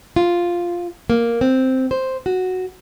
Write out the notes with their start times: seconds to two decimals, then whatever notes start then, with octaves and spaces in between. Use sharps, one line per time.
0.16 F4
1.10 A#3
1.41 C4
1.91 C5
2.26 F#4